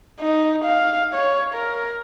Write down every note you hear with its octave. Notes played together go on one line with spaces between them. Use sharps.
D#4
F5
C#5
A#4